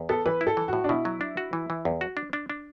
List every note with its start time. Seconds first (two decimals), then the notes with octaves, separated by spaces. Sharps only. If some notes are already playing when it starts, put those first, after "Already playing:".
Already playing: E2
0.09 B3 A4
0.26 E3 B4
0.41 E4
0.47 A4
0.57 E3
0.68 A2 F#4
0.84 D4
0.89 B2 E4
1.05 F#3
1.21 D4
1.37 F#4
1.53 E3
1.70 E3
1.85 E2
2.01 F#4
2.17 D4
2.33 D4
2.50 D4